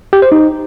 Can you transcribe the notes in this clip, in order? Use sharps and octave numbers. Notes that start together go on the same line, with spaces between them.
G4
C5
D#4